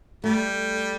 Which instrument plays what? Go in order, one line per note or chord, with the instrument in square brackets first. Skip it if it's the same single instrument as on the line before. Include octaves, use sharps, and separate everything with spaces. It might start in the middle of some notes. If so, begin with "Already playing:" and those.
[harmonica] G3 [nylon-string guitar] A3